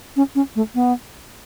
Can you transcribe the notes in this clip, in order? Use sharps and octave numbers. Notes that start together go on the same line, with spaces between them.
C#4
C#4
A3
B3